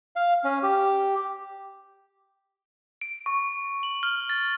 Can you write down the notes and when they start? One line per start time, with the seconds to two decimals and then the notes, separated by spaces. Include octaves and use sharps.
0.16 F5
0.44 C#4
0.63 G4
3.01 D7
3.26 C#6
3.83 F#7
4.03 F6
4.30 A6